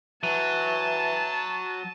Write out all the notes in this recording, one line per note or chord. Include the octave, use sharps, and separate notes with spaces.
E3 F#3 A5 D#7